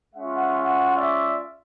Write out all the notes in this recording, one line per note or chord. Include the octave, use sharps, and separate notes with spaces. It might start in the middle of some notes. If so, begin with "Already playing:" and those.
G#3 C#4 F4 E5 F#5
D5 E5